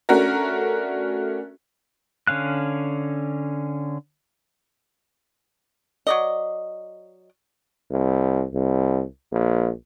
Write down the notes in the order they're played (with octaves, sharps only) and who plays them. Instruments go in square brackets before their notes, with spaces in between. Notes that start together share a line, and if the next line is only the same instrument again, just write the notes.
[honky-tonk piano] A3 C#4 D4 F#4 A#4
[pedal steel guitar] D3 C#4 F5 F#6
[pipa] F#3 D5 D#5
[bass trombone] C2
C2
A#1